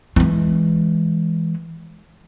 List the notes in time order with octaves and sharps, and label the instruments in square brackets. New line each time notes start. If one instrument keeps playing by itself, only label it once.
[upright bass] E3 G#3